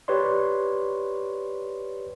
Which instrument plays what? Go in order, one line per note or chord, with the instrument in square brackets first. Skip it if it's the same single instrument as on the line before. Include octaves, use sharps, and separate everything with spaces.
[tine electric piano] G4 B4 C#5 D5 C6